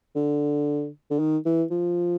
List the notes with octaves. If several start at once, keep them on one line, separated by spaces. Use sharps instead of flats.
D3
D3
D#3
E3
F3